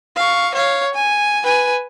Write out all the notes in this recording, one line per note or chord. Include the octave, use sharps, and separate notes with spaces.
F5 C#6
C#5 F5
G#5
B4 G#5